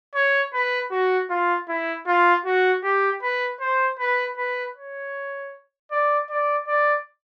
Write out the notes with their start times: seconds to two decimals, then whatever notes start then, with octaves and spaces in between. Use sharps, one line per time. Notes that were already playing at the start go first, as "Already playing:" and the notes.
0.15 C#5
0.54 B4
0.91 F#4
1.30 F4
1.69 E4
2.07 F4
2.45 F#4
2.83 G4
3.22 B4
3.61 C5
3.99 B4
4.37 B4
4.76 C#5
5.92 D5
6.30 D5
6.67 D5